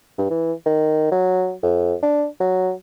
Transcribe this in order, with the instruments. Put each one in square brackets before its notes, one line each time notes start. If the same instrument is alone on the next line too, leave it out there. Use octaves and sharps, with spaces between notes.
[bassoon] G2
E3
D#3
F#3
F2
D4
F#3